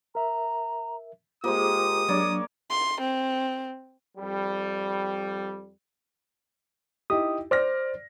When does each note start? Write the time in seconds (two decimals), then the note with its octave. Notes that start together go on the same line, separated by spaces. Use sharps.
0.15 A#4 E5 A#5
1.44 G#3 A#3 F4 G4 C5 D#6
2.08 F#3 A#3 D4 C#5 D5
2.70 C6
3.01 C4
4.18 F2 G3
7.10 D#4 E4 G4 D#6
7.51 C5 D5 F6 A#6